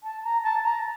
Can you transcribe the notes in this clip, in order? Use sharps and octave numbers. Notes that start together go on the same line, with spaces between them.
A5
A#5
A5
A#5